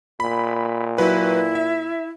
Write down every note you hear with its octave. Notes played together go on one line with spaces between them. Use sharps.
A#2 B5
F#3 E4 B4
E5